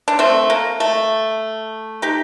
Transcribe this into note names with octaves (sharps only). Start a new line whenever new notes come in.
D4
A3 C4
A#3
A3
D#4 G4